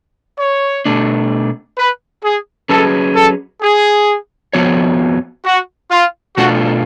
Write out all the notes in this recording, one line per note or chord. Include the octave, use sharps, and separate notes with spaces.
C#5
B2 A3 D4
B4
G#4
F#3 C#4 G#4 A4 B4
A4
G#4
F2 F3 B3 F#4 C#5
F#4
F4
B2 A3 D4 F4 F#4